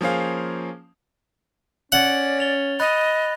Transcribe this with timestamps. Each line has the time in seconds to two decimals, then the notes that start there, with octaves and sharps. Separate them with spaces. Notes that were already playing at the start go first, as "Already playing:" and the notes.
0.01 F3 A#3 C#4 G#4 C5 F5
1.92 C#4 D5 F#5
2.39 A6 F7 G7
2.80 D#5 B5 F#6 A6